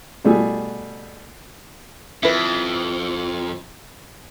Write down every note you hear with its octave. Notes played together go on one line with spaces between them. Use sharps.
B2 G3 A3 G#4
F2 E4 B4